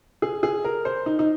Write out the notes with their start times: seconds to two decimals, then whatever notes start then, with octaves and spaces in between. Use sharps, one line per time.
0.22 G#4
0.43 G#4
0.65 A#4
0.85 C5
1.06 D#4
1.19 D#4